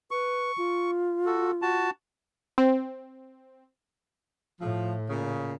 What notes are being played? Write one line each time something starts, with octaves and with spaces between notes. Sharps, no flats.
B4 C#6
F4
F#4 A4
F#4 A5
C4
A2 F3
A#2 C#3